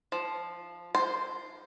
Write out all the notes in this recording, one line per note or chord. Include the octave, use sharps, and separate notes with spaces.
F3
C5